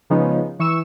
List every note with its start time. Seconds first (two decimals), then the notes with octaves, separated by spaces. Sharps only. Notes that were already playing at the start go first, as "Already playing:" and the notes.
0.10 C#3 F3 G#3 B3 C#4 D#4
0.59 E3 C#6 E6 E7